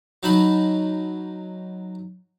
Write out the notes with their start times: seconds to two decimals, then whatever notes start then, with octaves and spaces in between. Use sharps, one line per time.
0.23 F#3 D#4 A5 B5